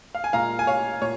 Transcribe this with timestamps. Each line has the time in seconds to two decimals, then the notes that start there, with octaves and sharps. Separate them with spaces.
0.15 F5
0.24 G#5
0.33 A#2 G#3 F5 A#5
0.59 G#5
0.67 C#5 F5
1.02 A#2 C#5